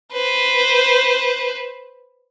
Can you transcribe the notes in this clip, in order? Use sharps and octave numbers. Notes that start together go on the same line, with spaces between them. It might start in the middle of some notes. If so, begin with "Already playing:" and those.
B4 C5